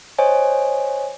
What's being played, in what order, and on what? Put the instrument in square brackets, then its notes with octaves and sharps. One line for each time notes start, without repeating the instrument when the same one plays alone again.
[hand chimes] C5 C#5 D#5 G#5